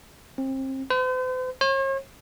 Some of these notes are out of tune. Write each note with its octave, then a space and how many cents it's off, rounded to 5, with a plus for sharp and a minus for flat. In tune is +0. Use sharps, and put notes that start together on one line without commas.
C4 +30
C5 -45
C#5 -45